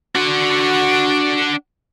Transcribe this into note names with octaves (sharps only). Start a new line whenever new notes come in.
D4 F#4 F#5